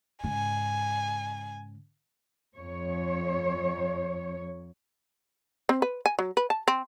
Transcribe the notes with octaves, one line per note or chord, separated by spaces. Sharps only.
G#2 C#3 G#5
F2 C#5
C4
B4
G#5
F#3
B4
A5
C4